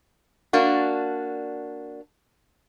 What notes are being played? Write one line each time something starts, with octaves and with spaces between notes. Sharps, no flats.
A#3 D4 F#4